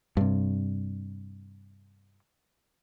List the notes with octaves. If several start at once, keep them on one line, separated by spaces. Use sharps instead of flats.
G2 C3